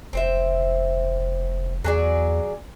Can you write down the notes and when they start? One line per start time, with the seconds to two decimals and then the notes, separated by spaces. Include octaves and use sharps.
0.13 F1 C4 C5 E5
1.84 E2 F#3 G#4 D5